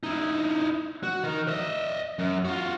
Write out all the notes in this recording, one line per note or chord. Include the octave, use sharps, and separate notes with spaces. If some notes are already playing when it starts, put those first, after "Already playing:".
D#4 E4
F#4
D#3 A#4
D#5 E5
F#2
F4 F#4